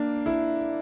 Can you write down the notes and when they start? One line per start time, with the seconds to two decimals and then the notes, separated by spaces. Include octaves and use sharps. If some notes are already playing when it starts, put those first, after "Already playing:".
Already playing: A#3 D4
0.26 E4